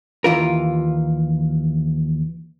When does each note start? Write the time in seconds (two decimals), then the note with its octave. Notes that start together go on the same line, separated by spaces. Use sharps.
0.24 D#2 E3 F4 A#4